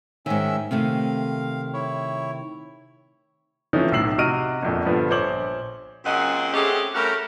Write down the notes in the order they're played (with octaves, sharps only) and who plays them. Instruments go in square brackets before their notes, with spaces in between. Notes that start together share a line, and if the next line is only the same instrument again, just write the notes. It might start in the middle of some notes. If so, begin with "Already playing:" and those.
[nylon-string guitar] G#2 D#3 [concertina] C#4 E5
[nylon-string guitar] C3 D#3 A3 [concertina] F5
[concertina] E4 C#5
[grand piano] E3 F3 A3 C4 C#4 D#4
B1 A2 D#4 E6 C7 F#7
C3 F#4 D#5 F6 D7 D#7
G1 F2 A#2
G2 D3 F3 B3
A#1 C5 C#5 D6 F#7
[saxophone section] F#2 A#2 C#3 C4 D#5 F#5
A3 C4 C#4 G4 G#4
G3 A3 C#4 F#4 A#4